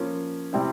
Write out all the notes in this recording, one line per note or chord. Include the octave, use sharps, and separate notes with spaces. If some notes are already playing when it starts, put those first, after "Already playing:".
Already playing: F3 A#3 C#4
C3 G3 C4 E4